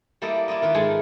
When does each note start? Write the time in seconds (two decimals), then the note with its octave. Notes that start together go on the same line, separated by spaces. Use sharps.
0.22 G3 A#3 E4 A4 D5 D#5
0.48 E4 F4 D5 D#5
0.62 D#3 F4 B4
0.75 G#2 G#3 A4 G#5